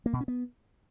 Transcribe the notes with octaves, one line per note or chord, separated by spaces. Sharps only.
A#3
B2
C#4
B3